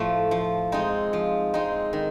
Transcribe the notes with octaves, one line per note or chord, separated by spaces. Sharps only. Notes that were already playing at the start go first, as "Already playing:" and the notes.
Already playing: A2 F3 A3
F3
G#3 C4 D#4
F3
G#3 C4 D#4
D#3